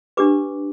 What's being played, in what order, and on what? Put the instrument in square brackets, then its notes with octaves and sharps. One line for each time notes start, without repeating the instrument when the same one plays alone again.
[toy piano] D4 G4 B4 D6